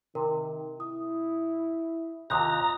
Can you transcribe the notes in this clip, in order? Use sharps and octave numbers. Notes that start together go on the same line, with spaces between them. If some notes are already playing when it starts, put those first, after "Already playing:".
C3 D#3 A#4
E4 D#6
D#2 C3 F4 A#5 D#6 F#6 G6